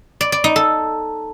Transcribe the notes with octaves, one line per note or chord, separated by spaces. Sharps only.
D5
D5
D#4
A4